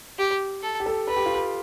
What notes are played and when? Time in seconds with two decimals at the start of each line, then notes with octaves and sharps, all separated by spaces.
0.19 G4
0.63 A4
0.80 G4
0.86 A4
1.08 A4 B4
1.16 G4
1.26 F4
1.35 G4